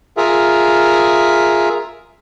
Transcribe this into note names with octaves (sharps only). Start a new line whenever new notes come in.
F4 G#4 A#4 E5